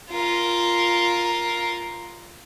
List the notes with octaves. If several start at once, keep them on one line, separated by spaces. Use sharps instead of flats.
F4 A#4